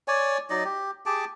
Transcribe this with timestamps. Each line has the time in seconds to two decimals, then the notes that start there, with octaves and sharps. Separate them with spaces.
0.08 C#5 D5 G#5
0.50 F#3 D#4 D5 D#5
0.65 G4
1.06 G4 G#4 A5 D6